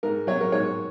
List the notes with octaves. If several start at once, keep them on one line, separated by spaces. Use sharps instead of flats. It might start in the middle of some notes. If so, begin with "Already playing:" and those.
G#2 A#4
F#3 C#5
A#4
G#2 C#5